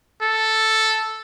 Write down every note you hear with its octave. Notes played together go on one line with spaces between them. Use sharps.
A4